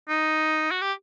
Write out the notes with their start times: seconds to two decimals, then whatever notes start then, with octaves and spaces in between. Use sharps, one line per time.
0.09 D#4
0.71 F#4
0.81 G4